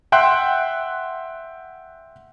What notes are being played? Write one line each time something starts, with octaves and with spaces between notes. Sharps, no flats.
E5 F#5 G5 C6 F#6